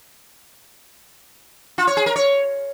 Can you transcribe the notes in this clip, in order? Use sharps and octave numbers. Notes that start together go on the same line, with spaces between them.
F4
C#5
G#4
A#4
C#5